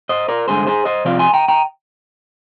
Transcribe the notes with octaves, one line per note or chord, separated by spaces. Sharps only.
C5 D#5
A#4 D5
G2 D3 G#3 G#4 C5
G#4 C5
C5 D#5
C3 F3 C4 F4 D5 F5
G#5 C6
G5 A#5
G5 A#5